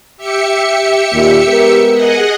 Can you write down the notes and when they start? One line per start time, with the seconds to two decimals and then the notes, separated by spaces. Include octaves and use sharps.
0.17 G4 E5 C#7
1.12 D#2 A#2
1.47 G#3 B3 A#4
1.92 G#4 D#5 F#5